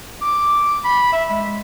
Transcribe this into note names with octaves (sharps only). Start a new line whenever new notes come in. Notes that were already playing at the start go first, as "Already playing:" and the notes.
D6
B5
E5
G#3